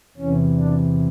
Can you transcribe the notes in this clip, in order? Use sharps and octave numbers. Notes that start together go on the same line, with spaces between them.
E2 C3 E3 C#4
D4